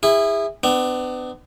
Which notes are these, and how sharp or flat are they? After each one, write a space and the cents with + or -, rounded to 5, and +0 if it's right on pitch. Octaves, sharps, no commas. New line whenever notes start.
E4 +0 G#4 -30
B3 +40 D4 +30